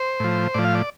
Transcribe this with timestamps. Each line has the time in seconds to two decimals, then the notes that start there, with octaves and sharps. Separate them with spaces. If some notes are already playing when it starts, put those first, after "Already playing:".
Already playing: C5
0.20 A2 F3
0.54 A2 F3 D5
0.64 F5
0.74 D5